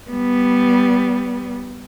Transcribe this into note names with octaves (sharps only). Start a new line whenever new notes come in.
G3 B3